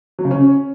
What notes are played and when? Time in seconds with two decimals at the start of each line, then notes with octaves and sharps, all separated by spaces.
0.19 F#3
0.25 C#3
0.31 C#4